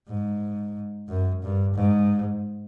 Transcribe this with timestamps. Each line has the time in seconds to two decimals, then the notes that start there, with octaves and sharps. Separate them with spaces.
0.08 G#2
1.09 F#2
1.42 G2
1.75 G#2